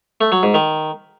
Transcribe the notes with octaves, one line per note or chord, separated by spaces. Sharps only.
A3
F#3
G#2
D#3